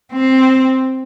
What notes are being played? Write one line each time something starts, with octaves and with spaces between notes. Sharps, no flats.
C4